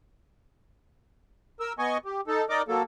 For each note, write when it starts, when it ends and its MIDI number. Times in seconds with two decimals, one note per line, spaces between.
1.60 1.73 70
1.60 1.73 88
1.79 1.97 59
1.79 1.97 75
1.79 1.97 80
1.79 1.97 85
2.05 2.21 67
2.27 2.45 63
2.27 2.45 69
2.49 2.62 63
2.49 2.62 70
2.49 2.62 74
2.49 2.62 75
2.49 2.62 86
2.68 2.83 54
2.68 2.83 58
2.68 2.83 69